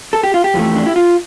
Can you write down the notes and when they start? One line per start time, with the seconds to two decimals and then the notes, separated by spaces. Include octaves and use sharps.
0.13 A4
0.23 G4
0.34 F4
0.44 G4
0.54 F2 E3 A3
0.76 D4
0.86 E4
0.96 F4